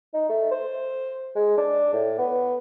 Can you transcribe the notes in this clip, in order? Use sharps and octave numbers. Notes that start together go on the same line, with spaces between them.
D#4
A3
C5
G#3
D4
A2
B3